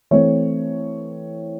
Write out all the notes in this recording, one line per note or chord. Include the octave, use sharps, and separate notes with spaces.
E3 A3 C4 C#5